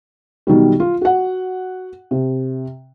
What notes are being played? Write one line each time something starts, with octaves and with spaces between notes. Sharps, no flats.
B2 D#3 F#3 G3
F4
F#4 F#5
C3